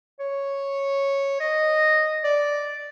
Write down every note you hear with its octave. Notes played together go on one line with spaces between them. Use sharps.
C#5
D#5
D5